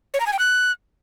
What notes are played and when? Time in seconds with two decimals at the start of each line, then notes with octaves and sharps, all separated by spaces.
0.14 C#5
0.20 A#5
0.26 G#5
0.33 G5
0.39 F#6